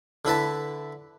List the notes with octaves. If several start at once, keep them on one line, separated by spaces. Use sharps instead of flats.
D3 E4 B4 A5